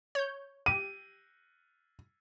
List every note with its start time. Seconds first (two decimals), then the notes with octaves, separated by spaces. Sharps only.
0.15 C#5 G6
0.66 G4 D#7